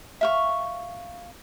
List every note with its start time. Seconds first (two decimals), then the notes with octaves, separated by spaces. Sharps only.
0.21 E5 F5 C#6